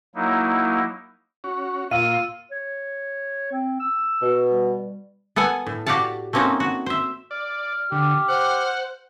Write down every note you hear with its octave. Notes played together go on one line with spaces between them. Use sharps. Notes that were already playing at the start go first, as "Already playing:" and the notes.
F#3 A#3 D#4 E4
C#4 F#4 C#5
A#2 F4 F5 E6 D#7
C#5
C4
E6
B2
G3
B3 A4 F#5 G#5
A2
F#4 G4 D5 F5 F#5 A5
A3 A#3 C4 C#4 D#4 F#4
F#4
C5 E5
D5 F6
D3 G4
C5 F#5